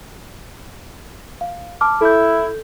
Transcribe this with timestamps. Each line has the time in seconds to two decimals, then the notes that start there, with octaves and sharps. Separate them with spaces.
1.41 F5
1.81 A5 D6 F6
2.01 E4 A4 G6